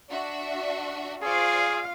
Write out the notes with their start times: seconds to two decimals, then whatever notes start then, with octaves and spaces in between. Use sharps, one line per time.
0.11 D4 F#4 E5
1.24 F4 G#4 C5 D5 F5 C#6